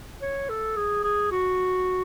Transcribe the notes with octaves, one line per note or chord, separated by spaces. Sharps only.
C#5
A4
G#4
G#4
F#4